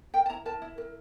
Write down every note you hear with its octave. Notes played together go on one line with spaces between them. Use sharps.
A#4 G5
A5
E4 A#5
A#4 A5
E4
A#4